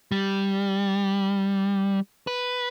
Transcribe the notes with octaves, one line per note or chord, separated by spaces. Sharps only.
G3
B4